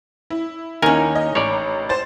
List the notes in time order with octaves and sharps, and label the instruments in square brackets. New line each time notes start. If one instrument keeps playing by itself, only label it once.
[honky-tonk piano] E4
[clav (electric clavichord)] D#2 A#4 G#5 [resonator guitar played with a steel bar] C#4 D#4
[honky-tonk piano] D#5
[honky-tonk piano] A1 [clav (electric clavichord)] C#5 D5
[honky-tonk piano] C5 A6